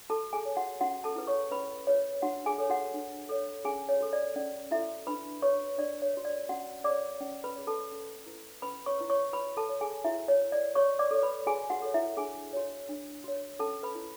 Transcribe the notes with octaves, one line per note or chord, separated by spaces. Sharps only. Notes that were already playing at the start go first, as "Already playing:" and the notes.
F#4 A4 A5
G#4 G#5
C#5
F#4 F#5
C#4 F#4 F#5
A4 A5
E4 G#4 B4
C#5 C#6
C#4 B4 B5
E4 G#4 B4 C#5
D4 F#4 F#5
G#4 G#5
A4 C#5
F#4 F#5
D4
A4 C#5
C#4 G#4 G#5
C#5
F#4 A4
D5
C#4 D5
E4 F#4 A4 E5
D4 B4 B5
F#4 B4 C#5 C#6
D4 D5
C#5
F#4 B4
D5
C#4 F#4 F#5
G#4 C#5 D5 D6
C#4
B4 B5
G#4 C#5
A4 A5
C#4
E4 B4
C#4 B4 B5
C#5 C#6
E4 B4
C#5 C#6
F#4 B4 B5
A4 A5
C#5
G#4 G#5
E4 F#4 E5
C#5
C#5
D5
F#4 C#5 C#6
D5 D6
A4 C#5
B4 B5
F#4 G#4 G#5
F#4 F#5
A4 C#5
E4 E5
D4 G#4 G#5
F#4 C#5
D4
F#4 C#5
C#4 A4 A5
B4 B5
E4 B4